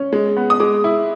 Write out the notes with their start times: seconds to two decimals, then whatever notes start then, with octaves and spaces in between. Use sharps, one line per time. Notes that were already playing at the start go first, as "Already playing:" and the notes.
Already playing: C#4
0.13 G#3
0.37 B3
0.50 D#6
0.60 G#3 D6
0.84 E4